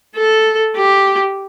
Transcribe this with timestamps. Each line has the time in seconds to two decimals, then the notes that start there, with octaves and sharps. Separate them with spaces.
0.16 A4
0.75 G4